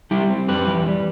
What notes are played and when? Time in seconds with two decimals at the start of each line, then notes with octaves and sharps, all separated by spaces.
0.11 G3 E4 G4
0.30 C4
0.48 F2 G4 B4
0.68 E3
0.86 G3